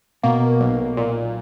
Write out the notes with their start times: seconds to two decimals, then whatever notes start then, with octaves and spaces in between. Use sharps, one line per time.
0.23 B2 A#3
0.60 B1
0.97 A#2